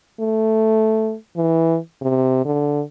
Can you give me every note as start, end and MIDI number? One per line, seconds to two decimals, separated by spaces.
0.20 1.15 57
1.36 1.78 52
2.01 2.42 48
2.45 2.82 50